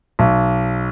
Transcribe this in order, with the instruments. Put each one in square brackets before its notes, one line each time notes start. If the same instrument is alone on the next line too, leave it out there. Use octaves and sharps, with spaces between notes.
[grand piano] B1